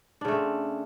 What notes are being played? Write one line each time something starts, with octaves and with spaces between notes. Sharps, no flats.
C#3 A3 C4 D4